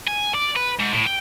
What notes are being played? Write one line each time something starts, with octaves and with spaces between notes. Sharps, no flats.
G#5
D5
B4
G#2
A2
G5